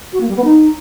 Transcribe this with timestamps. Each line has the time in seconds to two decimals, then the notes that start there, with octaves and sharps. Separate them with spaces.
0.13 F#4
0.21 A#3
0.28 G3
0.36 B3
0.44 D#4